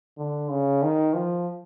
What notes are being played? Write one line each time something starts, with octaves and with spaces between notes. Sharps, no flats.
D3
C#3
D#3
F3